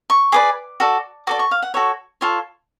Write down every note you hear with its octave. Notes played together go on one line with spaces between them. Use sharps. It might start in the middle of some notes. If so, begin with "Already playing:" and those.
C#6
G#4 B4 D5 D6
F#4 A4 D5
F#4 A4 D5 D6
C#6
F5
F#5
F#4 A4 C#5
F4 A4 C#5